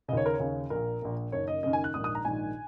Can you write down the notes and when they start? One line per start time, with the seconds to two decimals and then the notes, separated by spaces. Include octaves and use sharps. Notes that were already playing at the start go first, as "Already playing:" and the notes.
0.08 C#3 D#5
0.13 D#2 C#5
0.26 A#4
0.34 C#5
0.40 D#2 C#3
0.70 A#1 A#2 A#4
1.02 A#1 A#2
1.32 F#1 F#2 D#3 C#5
1.48 D#5
1.63 F#1 F#2 D#3 D#5
1.73 G#5
1.84 F#6
1.94 A#1 G#2 D#3 D#6
2.04 D#6
2.15 A#5
2.25 A#1 G#2 D#3 G#5